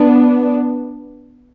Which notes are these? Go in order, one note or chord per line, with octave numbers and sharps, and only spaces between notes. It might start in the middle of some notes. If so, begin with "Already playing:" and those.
Already playing: B3 D4